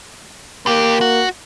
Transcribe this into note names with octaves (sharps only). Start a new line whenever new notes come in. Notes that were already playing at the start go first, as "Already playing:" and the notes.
D#2 A#3 G4
F#4